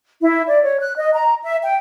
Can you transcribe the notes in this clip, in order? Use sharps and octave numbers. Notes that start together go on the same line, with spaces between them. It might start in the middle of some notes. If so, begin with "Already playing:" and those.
E4
D5
C#5
F#6
D#5
A#5
E5
G5